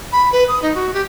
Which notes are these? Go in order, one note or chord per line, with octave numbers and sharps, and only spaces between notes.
B5
B4
D#6
D#4
F#4
G4